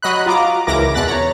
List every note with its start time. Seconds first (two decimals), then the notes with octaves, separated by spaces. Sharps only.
0.02 F#3 D#5 B5 F#6
0.26 F4 F#4 A#5 D6
0.67 C#2 E3 E4 A#4 D6 A#6
0.94 E2 B2 F#6 A6 B6
1.07 C#5 A#5